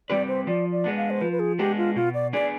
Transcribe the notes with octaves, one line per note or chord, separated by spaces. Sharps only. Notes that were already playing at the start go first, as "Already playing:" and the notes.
G3 C4 G4 B4 D5
C5
F3 D5
D5
G#3 B3 D4
F5
C5
F3 B4
B4
G#4
G#3 B3 D4 G4
F4
B2 F4
D5
B3 D4 G#4 D5